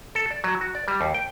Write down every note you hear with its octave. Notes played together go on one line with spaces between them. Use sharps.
A4
D5
F#3
F#4
D5
G3
D#2
G5